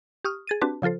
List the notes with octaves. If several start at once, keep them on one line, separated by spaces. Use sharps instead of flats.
G4 C#6 D#6 F6
G#4 A6 D#7
C4 D4 F#4 G4 B4 A5
C#3 F3 F4 A4 C5